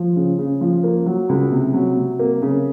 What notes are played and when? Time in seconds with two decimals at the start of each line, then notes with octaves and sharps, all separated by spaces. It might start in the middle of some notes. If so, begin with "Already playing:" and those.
Already playing: F3
0.16 C#3
0.39 C#3
0.61 F3
0.84 A#3
1.06 F#3
1.29 C#2
1.52 C3
1.74 F#3
1.97 C3
2.19 A#3
2.42 C#3